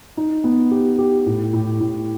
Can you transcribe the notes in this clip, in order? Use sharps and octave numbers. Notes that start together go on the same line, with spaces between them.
D#4
B3
G4
G4
A2
A2
A2